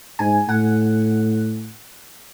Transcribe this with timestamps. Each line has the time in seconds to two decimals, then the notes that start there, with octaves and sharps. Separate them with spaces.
0.19 G#2 G#5
0.48 A2 F#5